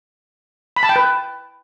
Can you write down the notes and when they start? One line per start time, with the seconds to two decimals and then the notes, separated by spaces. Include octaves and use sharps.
0.76 B5
0.83 A5
0.89 G5
0.96 B4